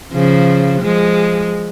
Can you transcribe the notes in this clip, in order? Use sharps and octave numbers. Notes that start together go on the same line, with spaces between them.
C#3 F3
F3 G#3